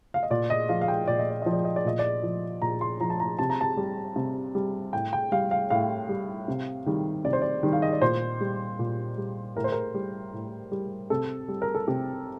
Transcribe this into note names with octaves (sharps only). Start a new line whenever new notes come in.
F5
D#5
A#2 D5
D#5
F3 F5
F5
G5
A#2 D5
D#5
D5
F3 D#5
D5
D#5
D5
A#2 D#5
D5
F3
A#2 A#5
C6
F3 A#5
A5
A#5
C3 A5
A#5
A5
G3
C3
G3
A2 G5
G5
G3 F5
F5
A2 F5
G3
C3
D#3 G3
C3 D5
C5
D5
D#3 G3
F5
D#5
D5
A#2 C5
G3
A#2
G3
A2 A#4
C5
A#4
G3
A2
G3
C3 A4
G3
A#4
A4
C3 G4